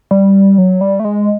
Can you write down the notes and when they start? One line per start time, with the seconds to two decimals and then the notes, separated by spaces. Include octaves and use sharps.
0.11 G3
0.58 F#3
0.81 G3
1.00 A3
1.05 G#3